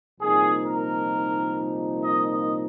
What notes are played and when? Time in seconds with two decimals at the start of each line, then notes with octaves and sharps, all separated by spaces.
0.20 C2 A#2 F3 A#3 D#4 G#4
0.66 A#4
2.01 D#5
2.31 D#5